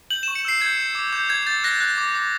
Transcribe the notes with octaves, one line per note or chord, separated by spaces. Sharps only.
G6 F#7
C#6 E7
C#7
E6 C7
G6 G#6
G6
D6
D6 G6
G6 G#6
G6 A6
F#6 A#6
F#6
D6
D6